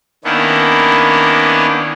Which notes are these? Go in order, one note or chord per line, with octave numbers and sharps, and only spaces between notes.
D#3 A#3 B3 C#4 D4 E4